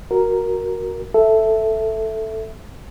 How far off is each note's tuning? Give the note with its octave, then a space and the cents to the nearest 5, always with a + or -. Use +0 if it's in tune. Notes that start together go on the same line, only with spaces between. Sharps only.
F#4 +0 A#4 +0
A4 +0 E5 +0